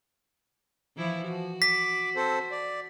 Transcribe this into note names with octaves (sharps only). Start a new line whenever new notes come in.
E3 F3 E4
F3 F#4
D6 B6
C4 A4 C5
D5